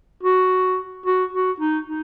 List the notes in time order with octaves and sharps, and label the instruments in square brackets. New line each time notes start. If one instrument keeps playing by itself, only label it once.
[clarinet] F#4
F#4
F#4
D#4
D#4